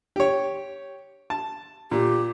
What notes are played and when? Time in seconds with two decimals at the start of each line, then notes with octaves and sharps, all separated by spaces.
0.16 G4 C#5
1.30 A5
1.91 A#2 G4